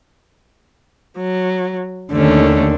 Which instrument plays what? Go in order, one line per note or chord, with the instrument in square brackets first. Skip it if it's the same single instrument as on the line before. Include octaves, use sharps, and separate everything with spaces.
[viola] F#3
[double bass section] D#2 D#3 [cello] D3 [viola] A3 C#4